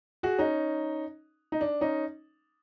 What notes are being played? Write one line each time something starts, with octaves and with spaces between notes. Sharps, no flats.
F#4 G#4
C#4 D#4
D#4
D4
C#4 D#4